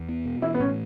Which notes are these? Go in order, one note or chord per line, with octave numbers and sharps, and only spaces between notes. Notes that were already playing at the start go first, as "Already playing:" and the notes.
Already playing: E2
B3
B2
E3 E4
B3
A2 C#4